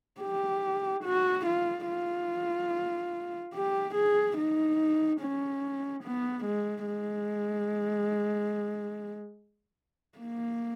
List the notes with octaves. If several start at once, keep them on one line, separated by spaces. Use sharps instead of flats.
G4
F#4
F4
F4
G4
G#4
D#4
C#4
B3
G#3
G#3
A#3